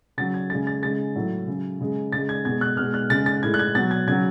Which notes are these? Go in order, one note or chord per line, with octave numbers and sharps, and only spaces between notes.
C#3 F#3 A6
G#6
C#3 G#3 A6
A6
C#3 G#3 A6
A2 F#3
C#3 F#3
C#3 G#3
C#3 G#3 A6
G#6
B2 G#3 G#6
F#6
B2 G#3 F6
F#6
C#3 G#3 A6
A6
A2 G#3 G#6
F#6
G#6
B2 F#3 A6
G#6
C#3 F#3 G#6